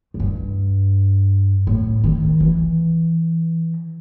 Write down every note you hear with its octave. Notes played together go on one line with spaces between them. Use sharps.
F#2
G2
A2
D#3
E3